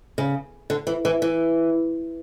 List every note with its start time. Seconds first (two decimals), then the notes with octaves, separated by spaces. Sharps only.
0.18 C#3
0.70 D3
0.87 E3
1.05 E3
1.22 E3